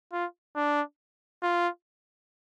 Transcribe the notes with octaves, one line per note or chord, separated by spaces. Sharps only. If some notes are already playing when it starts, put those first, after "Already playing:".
F4
D4
F4